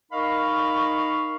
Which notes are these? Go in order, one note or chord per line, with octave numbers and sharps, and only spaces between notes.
D#4 A#4 D#5 F5 B5 C#6